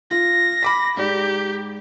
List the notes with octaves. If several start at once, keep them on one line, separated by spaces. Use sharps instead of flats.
F4 A#6
B5 D6 B6
G#2 G4 D5